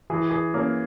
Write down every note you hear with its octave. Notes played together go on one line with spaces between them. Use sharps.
E3 G#4
G#4
A#3 C#4